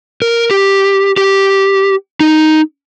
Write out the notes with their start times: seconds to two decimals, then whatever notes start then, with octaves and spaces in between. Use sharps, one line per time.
0.22 A#4
0.51 G4
1.17 G4
2.20 D#4